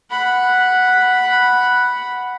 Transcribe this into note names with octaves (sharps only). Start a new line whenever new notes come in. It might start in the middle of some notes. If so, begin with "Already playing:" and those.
F#5 B5